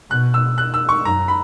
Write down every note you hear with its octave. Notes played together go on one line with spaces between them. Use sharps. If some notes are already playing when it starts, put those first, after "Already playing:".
B2 F#6
E6
F#6
E6
C#6
F#2 A#5
B5